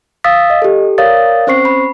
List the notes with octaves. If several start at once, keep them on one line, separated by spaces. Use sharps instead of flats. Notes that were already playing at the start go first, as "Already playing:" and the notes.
F5 D#6 E6 A6 B6
D#5
G4 A4
A#4 C#5 D5 F5 D#6 A6
C4 C#4 C5 C#6 C7
B5